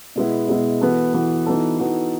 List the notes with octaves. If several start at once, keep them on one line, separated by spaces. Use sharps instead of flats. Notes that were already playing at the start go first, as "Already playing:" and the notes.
B2 G#3 B3 E4
B2 G#3 B3 E4
E3 B3 F#4 A4
E3 B3 F#4 A4
E3 B3 D#4 F#4 A4
E3 B3 D#4 F#4 A4